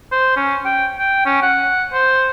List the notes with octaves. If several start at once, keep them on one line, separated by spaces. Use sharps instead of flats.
C5
C#4
G5
G5
C#4
F#5
C5